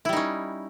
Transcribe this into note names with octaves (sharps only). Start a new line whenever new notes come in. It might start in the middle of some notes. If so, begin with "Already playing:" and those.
G3 C#4 D#4 E4